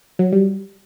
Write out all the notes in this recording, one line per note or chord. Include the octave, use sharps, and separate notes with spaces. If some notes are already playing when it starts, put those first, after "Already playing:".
F#3
G3